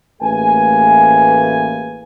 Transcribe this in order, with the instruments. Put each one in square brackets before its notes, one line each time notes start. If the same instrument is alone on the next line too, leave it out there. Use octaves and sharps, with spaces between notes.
[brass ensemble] A1 A3 A#3 G#4 B4 G#5